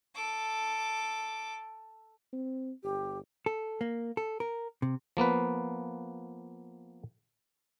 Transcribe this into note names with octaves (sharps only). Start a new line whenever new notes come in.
A4 D6
C4
G1 G4
A4
A#3
A4
A#4
C3
F3 A#3 B3 B4